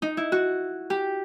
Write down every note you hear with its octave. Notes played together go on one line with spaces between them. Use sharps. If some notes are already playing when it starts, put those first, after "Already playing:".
D#4
E4
F#4
G4